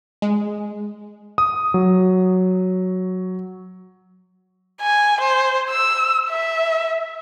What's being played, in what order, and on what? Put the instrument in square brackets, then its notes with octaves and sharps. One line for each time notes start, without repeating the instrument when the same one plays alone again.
[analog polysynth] G#3
[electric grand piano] D#6
F#3
[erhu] G#5
C5
E6
E5